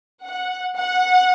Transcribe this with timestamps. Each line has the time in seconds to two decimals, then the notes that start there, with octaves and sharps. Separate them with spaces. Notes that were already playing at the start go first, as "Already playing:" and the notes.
0.24 F#5
0.77 F#5